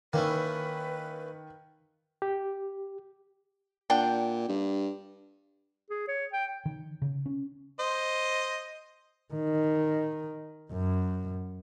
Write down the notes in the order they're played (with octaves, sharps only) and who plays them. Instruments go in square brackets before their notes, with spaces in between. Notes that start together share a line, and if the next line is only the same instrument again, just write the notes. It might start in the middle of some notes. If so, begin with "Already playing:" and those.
[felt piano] D#3 [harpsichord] A#3 C#4 E4 [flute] B4
[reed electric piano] G4
[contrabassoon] A#2 [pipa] D4 F#5 G5
[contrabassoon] G2
[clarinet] G#4
C#5
G5
[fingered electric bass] D#3
C#3
C#4
[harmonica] C5 D#5
[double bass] D#3
F#2